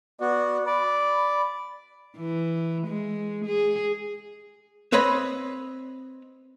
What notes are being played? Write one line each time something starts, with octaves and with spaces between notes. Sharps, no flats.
B3 F#4 D5
D5 B5
E3
G#3
G#4
C4 B4 C#5 D#5 B5